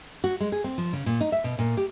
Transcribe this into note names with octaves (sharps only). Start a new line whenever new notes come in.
F#4
G#3
G#4
C4
F3
C#3
A#2
D#4
E5
B2
A#2
G4